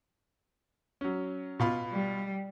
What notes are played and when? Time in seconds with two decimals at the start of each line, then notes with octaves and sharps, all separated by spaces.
1.01 F#3 C#4
1.60 B2 F4 B5
1.92 G3